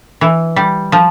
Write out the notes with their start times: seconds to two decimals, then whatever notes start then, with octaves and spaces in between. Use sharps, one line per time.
0.21 E3
0.56 G3
0.92 F3